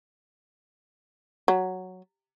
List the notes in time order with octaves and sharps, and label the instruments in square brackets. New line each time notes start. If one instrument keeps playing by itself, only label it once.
[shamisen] F#3